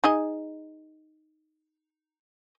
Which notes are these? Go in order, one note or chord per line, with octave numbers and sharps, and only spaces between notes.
D#4 G#4 D#5